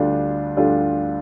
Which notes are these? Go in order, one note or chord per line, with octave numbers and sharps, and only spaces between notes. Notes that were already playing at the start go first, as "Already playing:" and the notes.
Already playing: D2 D3 G3 D4 F4
D2 D3 G3 D4 F4